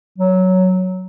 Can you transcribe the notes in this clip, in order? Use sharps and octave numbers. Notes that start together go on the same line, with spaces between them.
F#3